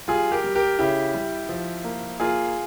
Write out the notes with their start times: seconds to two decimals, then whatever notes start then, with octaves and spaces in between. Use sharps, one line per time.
0.08 G3 F4 G#4
0.32 G4 A#4
0.44 G3
0.55 G4 A#4
0.79 C#3 E4 G4
1.14 G3
1.49 F3
1.84 A#3
2.20 A#3 F4 G#4